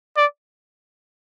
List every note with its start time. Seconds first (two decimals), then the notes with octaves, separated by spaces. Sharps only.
0.17 D5